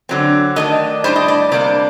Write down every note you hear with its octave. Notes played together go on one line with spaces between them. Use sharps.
D3 F#3 C4
D#3 A3 D4 D#5
A2 G3 D4 C5
D#5
D5
C3 G3 A#3 D4 D5